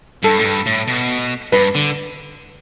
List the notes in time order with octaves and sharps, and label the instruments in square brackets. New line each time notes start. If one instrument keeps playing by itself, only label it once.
[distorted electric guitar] G2 [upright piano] A4
[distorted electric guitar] A2
G2
A2
B2
[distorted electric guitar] G2 [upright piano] B4
[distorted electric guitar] D3